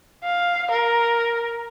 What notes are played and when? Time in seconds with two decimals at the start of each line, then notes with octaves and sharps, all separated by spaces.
0.24 F5
0.71 A#4